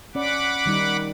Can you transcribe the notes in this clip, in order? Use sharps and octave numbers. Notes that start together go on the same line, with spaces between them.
C#4 D5 F#5 B5 D6
D#3 G3 D#4